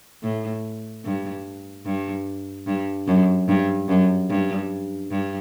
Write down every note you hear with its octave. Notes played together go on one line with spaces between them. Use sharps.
A2
G2
G2
G2
F#2
G2
F#2
G2
G2